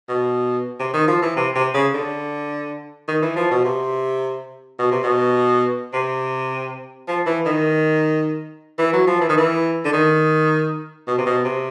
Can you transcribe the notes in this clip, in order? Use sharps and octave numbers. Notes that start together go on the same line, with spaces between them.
B2
C3
D#3
F3
E3
C3
C3
C#3
D3
D#3
E3
F3
B2
C3
B2
C3
B2
C3
F3
E3
D#3
E3
F#3
F3
E3
D#3
E3
D3
D#3
B2
C3
B2
C3